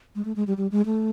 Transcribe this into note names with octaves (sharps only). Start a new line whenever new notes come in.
G#3
A3
G#3
G3
G3
G#3
A3